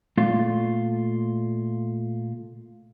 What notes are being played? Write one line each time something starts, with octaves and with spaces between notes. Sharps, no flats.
A#2 A3 F4